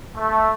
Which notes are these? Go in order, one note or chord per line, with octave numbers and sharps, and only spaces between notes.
A3